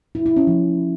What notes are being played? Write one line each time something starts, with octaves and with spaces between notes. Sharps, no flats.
E4
E4
C#4
F3